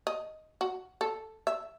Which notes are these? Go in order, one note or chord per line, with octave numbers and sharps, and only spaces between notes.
D#5
F#4
A4
E5